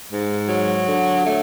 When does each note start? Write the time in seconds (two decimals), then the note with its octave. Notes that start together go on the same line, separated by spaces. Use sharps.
0.11 G#2
0.49 F#3
0.87 D3
1.25 A3